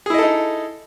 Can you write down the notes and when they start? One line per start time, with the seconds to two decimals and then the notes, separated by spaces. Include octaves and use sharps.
0.06 G#4
0.10 E4
0.14 D#5
0.18 A4
0.22 D#4